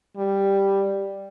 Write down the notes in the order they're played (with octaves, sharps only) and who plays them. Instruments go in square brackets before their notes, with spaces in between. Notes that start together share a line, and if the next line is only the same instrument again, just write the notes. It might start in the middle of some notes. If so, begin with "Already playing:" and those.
[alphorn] G3